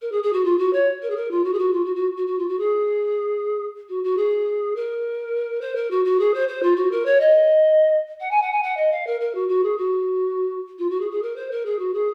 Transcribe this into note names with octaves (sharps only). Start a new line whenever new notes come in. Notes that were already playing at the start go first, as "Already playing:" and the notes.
A#4
G#4
G#4
F#4
F4
F#4
C#5
A#4
G#4
A#4
F4
F#4
G#4
F#4
F4
F#4
F#4
F#4
F#4
F4
F#4
G#4
F#4
F#4
G#4
A#4
C5
A#4
F#4
F#4
G#4
C5
C5
F4
F#4
A#4
C#5
D#5
F#5
G#5
F#5
G#5
F#5
D#5
F5
A#4
A#4
F#4
F#4
G#4
F#4
F4
F#4
G#4
G#4
A#4
C5
A#4
G#4
F#4
G#4